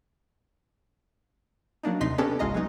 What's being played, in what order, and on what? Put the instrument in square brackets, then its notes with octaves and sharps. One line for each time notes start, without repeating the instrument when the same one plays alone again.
[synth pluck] F#3 A#3 D4 D#4
D#2 C3 D#4 C6 B6 C7
B3 C#4 D4 G4 A4
G1 C2 G#3 F4 D#5 A#5
F#3 G#3 B3 D#4